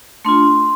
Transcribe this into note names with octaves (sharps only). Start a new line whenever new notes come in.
A3 D4 F4 C6